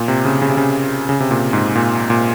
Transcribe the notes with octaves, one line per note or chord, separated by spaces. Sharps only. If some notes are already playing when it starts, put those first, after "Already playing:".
Already playing: A#2
C3
C#3
C#3
C3
C#3
C#3
C3
A#2
G#2
A#2
A#2